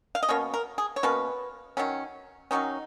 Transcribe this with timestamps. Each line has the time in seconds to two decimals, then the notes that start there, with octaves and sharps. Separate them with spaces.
0.15 F5
0.23 D#5
0.29 B2 A#3 C#4 C#5
0.54 A#4
0.78 G#4
0.96 C#5
1.03 B2 A#3 C#4 B4
1.77 D#3 F#3 C#4
2.51 D#3 F#3 C#4 D#4